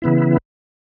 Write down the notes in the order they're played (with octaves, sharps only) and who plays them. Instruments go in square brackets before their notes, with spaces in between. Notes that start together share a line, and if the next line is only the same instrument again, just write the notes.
[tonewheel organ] C#3 E3 B3 E4